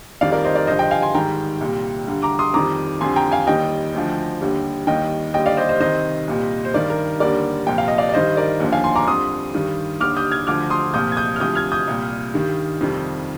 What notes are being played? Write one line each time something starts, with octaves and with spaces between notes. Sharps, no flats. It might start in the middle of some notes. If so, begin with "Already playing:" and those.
F2 D#3 G3 D5 F5
A#4 D5
C5 D#5
A#4 D5
G2 D3 F3 C5 D#5
D#5 G5
F5 G#5
G#5 C6
G#2 D#3 G3 G5 A#5
C2 A#2 G3
G2 D3 G3
A#5 D6
C6 D#6
F2 D#3 G3 A#5 D6
F2 D3 G3 G#5 C6
G5 A#5
F5 G#5
D#2 D#3 G3 D#5 G5
D2 D3 F3
D#2 D3 G3
D#2 D#3 G3 D#5 G5
D#2 D3 G3 D#5 G5
D5 F5
C5 D#5
C5 D#5
C2 C3 D#3 C5 D#5
C2 A#2 G3
C5
G2 D#3 G3 A#4 D5
A#4
D#2 D3 G3 A#4 D5
C2 A#2 F3 G5
F5
D#5
D5 F5
D5
G2 D#3 G3 C5 D#5
A#4 D5
D#2 D3 F3
F5 G#5
G#5 C6
A#5 D6
F2 D3 G3 C6 D#6
G2 D#3 G3
D#2 D3 G3 D6 F6
D#6 G6
F6 G#6
D2 D3 F3 D6 F6
C6 D#6
C2 A#2 F3 D#6 G6
G#6
D#6 G6
F6
D2 C3 F3 D#6 G6
F6 G#6
D#6 G6
C2 A#2 G3
G2 D#3 G3
F2 C3 D#3 G3